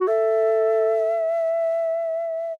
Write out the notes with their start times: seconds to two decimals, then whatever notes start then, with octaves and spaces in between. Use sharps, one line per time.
0.01 F#4
0.07 A4 E5